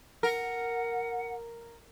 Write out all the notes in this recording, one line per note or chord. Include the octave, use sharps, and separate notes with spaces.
A#4 F#5